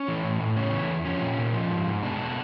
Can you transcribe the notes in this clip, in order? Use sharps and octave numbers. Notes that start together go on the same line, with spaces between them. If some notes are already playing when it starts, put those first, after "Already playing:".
Already playing: C#4
E3
A2
A2
C#3 C#4
E3
E2
F3 C#4
A#2
A#2
F3
G#2
G#2
B2 D4